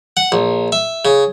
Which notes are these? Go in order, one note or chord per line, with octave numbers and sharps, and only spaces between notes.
F#5
A#1
E5
C#3